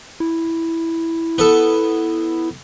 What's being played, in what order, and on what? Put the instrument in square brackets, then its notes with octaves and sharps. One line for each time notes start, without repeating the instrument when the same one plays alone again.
[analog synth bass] E4
[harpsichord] B3 A4